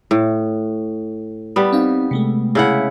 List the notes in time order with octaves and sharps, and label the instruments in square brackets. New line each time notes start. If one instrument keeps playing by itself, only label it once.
[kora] A2
G3 B3
[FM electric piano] C4 D#4 F5
C3 G#3 A3
[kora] C#3 E4 F#5